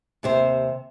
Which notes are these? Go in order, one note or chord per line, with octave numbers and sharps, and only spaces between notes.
D#2 C3 C5